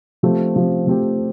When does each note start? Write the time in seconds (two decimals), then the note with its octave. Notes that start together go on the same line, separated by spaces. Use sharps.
0.23 F3 A3 C4 G4
0.56 F3 A3 C4 G4
0.87 F3 A3 C4 G4